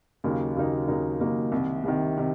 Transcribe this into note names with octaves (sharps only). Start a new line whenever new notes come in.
D#2 C#3 F#3 A#3 D#4
D#2 C#3 F#3 A#3 D#4
D#2 C#3 F#3 A#3 D#4
D#2 C#3 F#3 A#3 D#4
C2 C3 D#3
C2 C3 D#3
C3 D#3